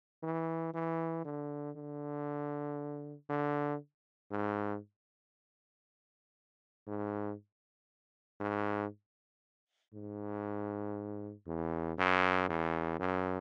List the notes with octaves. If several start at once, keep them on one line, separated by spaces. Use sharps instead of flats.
E3
E3
D3
D3
D3
G#2
G#2
G#2
G#2
E2
F#2
E2
F#2